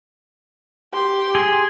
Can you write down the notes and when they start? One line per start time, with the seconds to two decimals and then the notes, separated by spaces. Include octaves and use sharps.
0.93 G4 C6
1.35 G#4